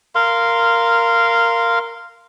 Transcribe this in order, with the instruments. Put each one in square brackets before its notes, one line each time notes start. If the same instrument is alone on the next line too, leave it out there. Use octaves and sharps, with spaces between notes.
[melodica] A#4 F5 C6